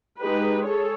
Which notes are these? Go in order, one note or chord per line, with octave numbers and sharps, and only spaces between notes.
G#3 D#4 G4 B4
G#4 A4 C#5